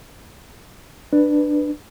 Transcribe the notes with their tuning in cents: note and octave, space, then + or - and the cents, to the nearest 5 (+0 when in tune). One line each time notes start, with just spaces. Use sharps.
D4 +15 B4 +0